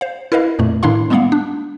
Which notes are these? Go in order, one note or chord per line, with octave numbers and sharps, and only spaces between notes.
C5 F5
E4 A#4 B4 D#5 F5
F2 A#2 A3
A2 D#3 D4 E4 F5 C6
G3 G#3 A#3 B3 F5 F#5
D4